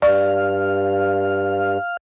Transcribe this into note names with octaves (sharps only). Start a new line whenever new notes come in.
G2 D5 F5 C#6